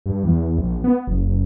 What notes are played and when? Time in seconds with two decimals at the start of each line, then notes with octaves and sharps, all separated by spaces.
0.06 G2
0.23 E2
0.58 A#1
0.84 B3
1.07 F#1